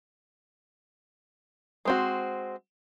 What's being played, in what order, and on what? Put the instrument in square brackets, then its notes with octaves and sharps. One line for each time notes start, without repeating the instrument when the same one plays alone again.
[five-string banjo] G#3 C4 F#4